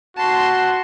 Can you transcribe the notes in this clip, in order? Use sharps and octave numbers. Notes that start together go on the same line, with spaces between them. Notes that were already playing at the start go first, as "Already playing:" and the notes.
F#4 A5 C6